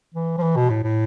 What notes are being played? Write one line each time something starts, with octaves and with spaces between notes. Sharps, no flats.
E3
F3
E3
B2
A2
A2